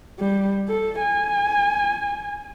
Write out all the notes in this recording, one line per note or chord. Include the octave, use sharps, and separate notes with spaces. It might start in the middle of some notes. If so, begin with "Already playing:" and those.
G3
A4
G#5